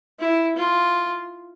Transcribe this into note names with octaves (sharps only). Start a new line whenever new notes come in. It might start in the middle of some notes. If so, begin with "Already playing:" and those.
E4
F4